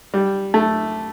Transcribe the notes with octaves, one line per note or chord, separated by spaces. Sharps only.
G3
A3